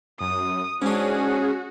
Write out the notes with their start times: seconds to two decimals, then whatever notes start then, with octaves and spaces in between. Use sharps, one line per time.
0.21 F#2 D#6
0.82 G#2 C#4 D4 F#4 G#4